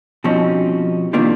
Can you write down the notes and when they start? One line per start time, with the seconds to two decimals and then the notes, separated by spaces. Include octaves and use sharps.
0.24 B2 F3 G3 C4 C#4 D#4
1.13 C3 D#3 A#3 D4 F4 G4